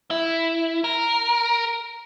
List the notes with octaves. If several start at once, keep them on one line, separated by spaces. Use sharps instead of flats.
E4
A#4